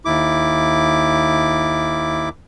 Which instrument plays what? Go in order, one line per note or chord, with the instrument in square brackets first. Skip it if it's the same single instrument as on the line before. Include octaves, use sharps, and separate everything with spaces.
[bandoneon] D#2 E4 D6